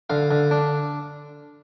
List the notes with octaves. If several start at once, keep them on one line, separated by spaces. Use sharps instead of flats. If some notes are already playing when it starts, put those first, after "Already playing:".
D3 F5
D3
D4